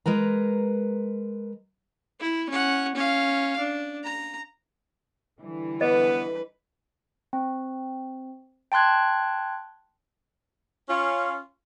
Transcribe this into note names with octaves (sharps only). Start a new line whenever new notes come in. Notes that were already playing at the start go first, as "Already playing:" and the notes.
G#3 A#4 B4 A#5
E4
C#4 F#5
C#4 F5
D4
A#5
D3 E3 G3
B3 B4 D#5
C4
G5 A5 C6 F#6 G#6
C#4 F4